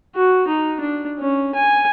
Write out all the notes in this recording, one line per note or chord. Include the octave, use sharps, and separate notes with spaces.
F#4
D#4
D4
C#4
G#5